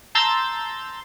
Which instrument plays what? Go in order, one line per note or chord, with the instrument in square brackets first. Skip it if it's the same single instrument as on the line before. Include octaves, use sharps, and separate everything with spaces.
[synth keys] A5 A#5 C6 E6 G6 A6